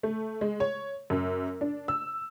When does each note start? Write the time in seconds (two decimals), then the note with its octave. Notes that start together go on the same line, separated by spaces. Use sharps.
0.03 A3
0.41 G#3
0.60 C#5
1.10 F#2
1.61 D4
1.88 E6